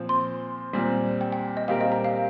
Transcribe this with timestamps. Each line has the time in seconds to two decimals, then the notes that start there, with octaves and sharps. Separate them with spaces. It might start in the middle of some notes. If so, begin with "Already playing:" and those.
Already playing: A#2 F3 C4
0.09 C6
0.73 A#2 G3 C4
1.21 G5
1.32 G5
1.57 D#5
1.68 A#2 G3 C4 G4 A#4 F5
1.81 D#5
1.92 A#5
2.04 F5